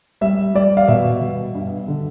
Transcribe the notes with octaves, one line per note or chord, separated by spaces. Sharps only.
G3 E5
G3 D5
F5
B2 E5
B2
G2
D3